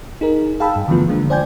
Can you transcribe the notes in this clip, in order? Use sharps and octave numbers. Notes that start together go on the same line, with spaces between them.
D#4 G#4 A#4
G#4 F5 G5 A5 B5 E6
G2
D3 E3 F3 A3 B3 F4
D3 G#3 A#3 D4
C5 D5 G5 G#5 G6 G#6